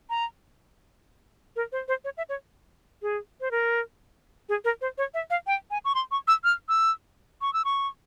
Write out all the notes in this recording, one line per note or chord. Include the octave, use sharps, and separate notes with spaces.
A#5
A#4
C5
C5
C#5
E5
C#5
G#4
C5
A#4
G#4
A#4
C5
C#5
E5
F5
G5
G#5
C#6
C6
C#6
E6
F6
E6
C#6
E6
C#6